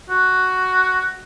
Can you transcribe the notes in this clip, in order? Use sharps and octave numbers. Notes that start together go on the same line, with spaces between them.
F#4